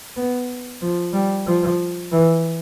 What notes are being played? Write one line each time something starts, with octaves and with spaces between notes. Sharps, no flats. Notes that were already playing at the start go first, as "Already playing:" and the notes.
B3
F3
G3
F3
E3